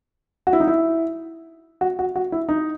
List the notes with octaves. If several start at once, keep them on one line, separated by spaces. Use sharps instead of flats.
F#4
E4
D#4
E4
F#4
F#4
F#4
E4
D#4